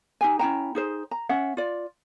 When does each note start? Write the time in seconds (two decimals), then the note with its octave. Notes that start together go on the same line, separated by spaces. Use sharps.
0.21 D#4 G4 G#5
0.39 C#4 E4 G5 A#5
0.75 D#4 G#4 C5
1.11 A#5
1.29 C#4 E5 F#5
1.57 F4 D5